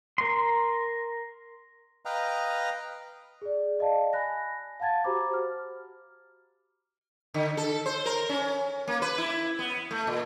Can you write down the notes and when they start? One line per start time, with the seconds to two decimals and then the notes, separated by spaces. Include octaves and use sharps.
0.18 A#4 C6
2.05 B4 D#5 F5 G5 A#5
3.42 G#4 D5
3.79 D5 D#5 F5 A5
4.13 G#5 B5 F#6 A#6
4.80 F5 F#5 A5 G#6 A6
5.04 F#4 G4 C5 A#5 B5 D6
5.33 F6
7.34 D3
7.57 A4
7.86 C5
8.06 A#4
8.29 C#4
8.88 A#3
9.02 B4
9.18 E4
9.59 B3
9.91 A3
10.07 A#2